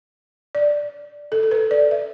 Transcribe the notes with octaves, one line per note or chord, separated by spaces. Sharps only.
D5
A4
A4
B4
D5
E5